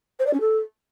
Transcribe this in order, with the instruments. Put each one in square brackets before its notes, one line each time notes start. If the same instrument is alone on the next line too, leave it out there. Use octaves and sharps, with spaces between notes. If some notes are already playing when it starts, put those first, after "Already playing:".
[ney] C5
D5
C#4
A4